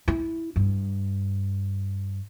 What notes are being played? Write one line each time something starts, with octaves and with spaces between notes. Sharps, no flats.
E4
G2